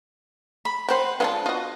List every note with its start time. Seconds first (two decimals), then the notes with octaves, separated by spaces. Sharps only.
0.65 B5
0.89 B4 C5 F#5 G5 C6
1.20 G#3 B3 D4 F4 G#5 A5
1.46 F4 F#4 D#5